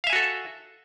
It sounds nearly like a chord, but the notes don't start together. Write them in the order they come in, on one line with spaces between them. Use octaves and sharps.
F5 E5 G#5 F#4 A4